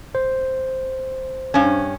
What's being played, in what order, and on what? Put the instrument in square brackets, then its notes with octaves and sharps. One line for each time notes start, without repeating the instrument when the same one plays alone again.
[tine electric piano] C5
[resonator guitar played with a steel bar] G2 C#4